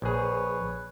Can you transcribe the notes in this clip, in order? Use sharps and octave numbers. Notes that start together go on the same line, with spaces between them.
A#1 G#4 B4 C#5